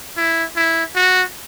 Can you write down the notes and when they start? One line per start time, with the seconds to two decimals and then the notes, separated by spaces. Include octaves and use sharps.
0.17 E4
0.56 E4
0.95 F#4